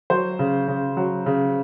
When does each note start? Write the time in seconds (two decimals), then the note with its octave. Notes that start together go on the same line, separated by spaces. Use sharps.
0.10 F#3 C5
0.39 C#3
0.68 C#3
0.97 F#3
1.26 C#3